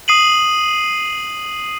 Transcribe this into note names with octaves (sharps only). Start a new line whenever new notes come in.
D#6 C7 D#7 F#7